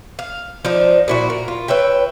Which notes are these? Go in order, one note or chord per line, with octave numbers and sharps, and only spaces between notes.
F5
F3 D4 D#4
A#2 E4 F#4
A#4
F4
B4 C#5 E5 G5